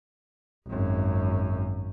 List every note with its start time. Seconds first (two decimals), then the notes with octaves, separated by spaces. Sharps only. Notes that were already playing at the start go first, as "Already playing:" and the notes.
0.68 G#1 F#2